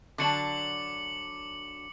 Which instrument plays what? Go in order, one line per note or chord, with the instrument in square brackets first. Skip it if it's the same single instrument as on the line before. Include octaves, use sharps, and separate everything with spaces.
[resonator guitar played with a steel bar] D3 F#3 D4 [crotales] D6 C#7 F#7